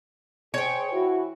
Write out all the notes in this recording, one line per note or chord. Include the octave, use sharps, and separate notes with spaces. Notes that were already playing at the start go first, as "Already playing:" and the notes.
G#4 C5 C#5 G5
E3 E4 F#4